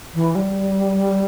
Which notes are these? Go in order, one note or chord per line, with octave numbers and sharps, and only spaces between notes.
E3
G3